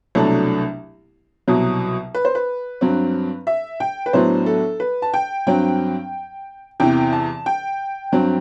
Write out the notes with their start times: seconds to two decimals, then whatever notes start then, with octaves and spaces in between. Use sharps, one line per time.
0.15 C2 B2 F#3 A3 D4
1.48 C2 B2 F#3
2.15 B4
2.25 C5
2.35 B4
2.81 G2 F#3 C4
3.47 E5
3.80 G5
4.06 B4
4.13 A2 F#3 B3 D4 C5
4.46 A4
4.80 B4
5.02 A5
5.14 G5
5.46 G2 F#3 C4 G5
6.80 E2 C3 E3 G5
7.13 A5
7.46 G5
8.12 G2 F#3 C4